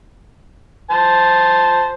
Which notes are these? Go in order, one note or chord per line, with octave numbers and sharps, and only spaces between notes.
C5 A5